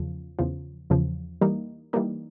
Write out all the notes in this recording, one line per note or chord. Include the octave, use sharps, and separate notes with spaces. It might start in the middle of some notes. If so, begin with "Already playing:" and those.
Already playing: E2 C#3 F3
E2 C#3 F3
E2 C#3 F3
E3 G3 A#3 D#4
E3 G3 A#3 D#4